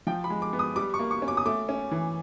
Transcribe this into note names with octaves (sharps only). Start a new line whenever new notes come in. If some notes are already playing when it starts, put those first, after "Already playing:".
F3 G5
B5
G#3
D6
B3
D#6
G3 D6
C#6
A#3
C#6
C#4
D6
D#6
A3 D6
C#4
E3